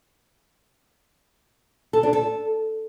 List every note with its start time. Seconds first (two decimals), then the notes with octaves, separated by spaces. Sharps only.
1.93 A4
2.03 D4
2.13 A4